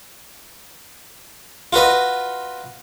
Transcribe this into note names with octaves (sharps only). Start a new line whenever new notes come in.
F4 F#4 B4 D#5